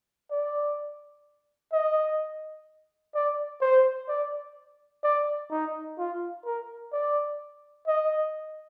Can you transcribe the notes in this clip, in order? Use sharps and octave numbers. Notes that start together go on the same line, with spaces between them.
D5
D#5
D5
C5
D5
D5
D#4
F4
A#4
D5
D#5